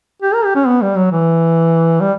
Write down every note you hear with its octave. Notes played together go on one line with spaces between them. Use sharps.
G4
A#4
G4
C#4
B3
G3
F#3
E3
G3